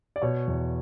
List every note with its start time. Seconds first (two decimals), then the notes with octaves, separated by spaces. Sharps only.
0.16 D5
0.22 B2 C#5
0.47 E2